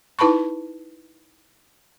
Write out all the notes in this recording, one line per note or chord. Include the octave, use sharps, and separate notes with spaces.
D#4 E4 B4 A5 B5 C#6